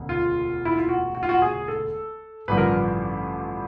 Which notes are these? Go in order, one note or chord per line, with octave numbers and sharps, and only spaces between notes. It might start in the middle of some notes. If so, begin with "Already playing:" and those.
Already playing: E1 D2 C#3
F4
E4
F4
F#4
F#4
F4
F#4
G#4
A4
A1 G2 D3 F3 B4
A#4
B4